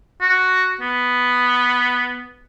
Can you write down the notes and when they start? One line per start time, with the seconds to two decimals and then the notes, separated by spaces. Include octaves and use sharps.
0.21 F#4
0.81 B3